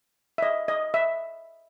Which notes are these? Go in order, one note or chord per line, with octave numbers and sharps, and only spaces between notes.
E5
D#5
D#5
E5